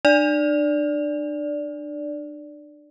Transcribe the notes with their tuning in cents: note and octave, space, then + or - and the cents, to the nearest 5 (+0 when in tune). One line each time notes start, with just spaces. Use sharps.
D4 +35 D5 -10